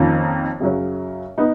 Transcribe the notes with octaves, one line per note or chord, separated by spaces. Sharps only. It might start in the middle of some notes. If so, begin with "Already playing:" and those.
Already playing: F2 D#3 A#3 C#4 F4
F#2 C#3 F#3 C#4
B3 D#4